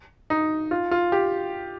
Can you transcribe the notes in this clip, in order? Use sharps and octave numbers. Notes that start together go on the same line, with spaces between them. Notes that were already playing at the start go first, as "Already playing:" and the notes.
D#4
F4
F4
G4